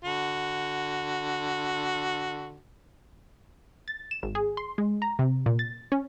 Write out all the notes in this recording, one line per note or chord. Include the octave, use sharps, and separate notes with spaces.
D3 F#4
A6
E7
G#1
G#4
C6
G#3
A#5
C3
A#2
A6
C#4